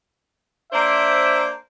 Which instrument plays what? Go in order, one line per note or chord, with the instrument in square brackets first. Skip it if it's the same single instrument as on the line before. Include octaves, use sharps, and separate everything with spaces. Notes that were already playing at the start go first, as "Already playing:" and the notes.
[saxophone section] A#3 D4 C5 [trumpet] E5